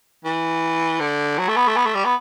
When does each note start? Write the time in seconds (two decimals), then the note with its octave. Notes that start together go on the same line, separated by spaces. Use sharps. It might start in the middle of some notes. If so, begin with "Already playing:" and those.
0.25 E3
1.00 D3
1.38 F#3
1.48 A3
1.56 B3
1.67 A3
1.76 B3
1.85 A3
1.95 G3
2.05 B3